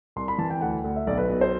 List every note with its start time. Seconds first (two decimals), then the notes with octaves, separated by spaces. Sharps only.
0.16 C2 C6
0.28 B5
0.38 E3 A5
0.50 G5
0.61 D2 F#5
0.84 D2
0.96 E5
1.07 B1 D5
1.18 B4
1.29 B2 B4
1.41 C5